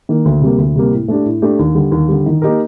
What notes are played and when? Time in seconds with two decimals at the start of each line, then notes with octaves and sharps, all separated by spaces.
0.09 D#3 A#3
0.25 D2
0.41 C3 G3 A#3
0.58 D2
0.76 C3 G3 A#3
0.92 A2
1.08 A3 D4 G4
1.25 A2
1.42 A3 D4 G4
1.59 D#2
1.75 D3 G3
1.92 D#2
2.08 D3 G3
2.26 D#3
2.42 A#3 D#4 G4 A#4